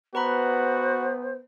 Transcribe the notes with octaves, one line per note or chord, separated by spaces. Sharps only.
B3 F#4 B4 C5 A#5 B5